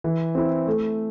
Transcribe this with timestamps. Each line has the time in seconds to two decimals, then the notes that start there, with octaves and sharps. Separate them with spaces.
0.04 E3
0.35 C4 E4
0.67 A3